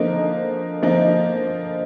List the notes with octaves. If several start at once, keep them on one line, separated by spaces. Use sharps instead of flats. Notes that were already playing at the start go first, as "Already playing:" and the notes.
Already playing: D3 F3 A#3 D#4
D3 F3 A#3 D#4